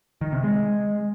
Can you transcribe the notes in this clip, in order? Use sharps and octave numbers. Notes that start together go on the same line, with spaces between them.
D#3
C3
G#3